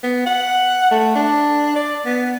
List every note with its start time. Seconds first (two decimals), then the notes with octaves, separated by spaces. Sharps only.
0.04 B3
0.27 F#5
0.91 A3
1.16 D4
1.76 D5
2.06 B3